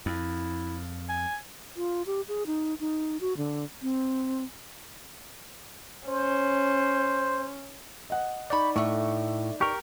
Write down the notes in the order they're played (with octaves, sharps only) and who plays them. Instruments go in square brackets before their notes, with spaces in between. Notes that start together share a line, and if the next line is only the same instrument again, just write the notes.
[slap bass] F2 [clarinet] E4
[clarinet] G#5
[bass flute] F4
G4
G#4
D#4
D#4
F#4
D3
C4
[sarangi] C#4 [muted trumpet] C5
[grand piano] D#5 F#5
[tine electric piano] D#4 D5 [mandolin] B5 C#6 G6
[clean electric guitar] A2 [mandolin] A3 C#6
[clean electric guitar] G4 A#4 [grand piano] C#6